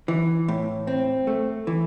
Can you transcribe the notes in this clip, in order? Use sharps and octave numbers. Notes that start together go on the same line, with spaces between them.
E3
A2
C4
A3
E3